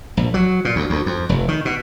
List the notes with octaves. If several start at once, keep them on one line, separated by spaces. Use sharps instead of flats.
A#1
F#3
A#2
D2
D2
F2
F1
D#3
B2